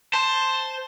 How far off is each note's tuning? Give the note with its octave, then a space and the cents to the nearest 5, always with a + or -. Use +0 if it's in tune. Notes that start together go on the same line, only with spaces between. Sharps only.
C5 +0 A5 +0